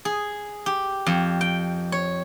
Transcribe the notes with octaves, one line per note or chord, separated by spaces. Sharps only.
G#4
G4
F2
G5
C#5